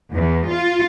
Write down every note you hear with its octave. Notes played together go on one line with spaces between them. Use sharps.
E2
F4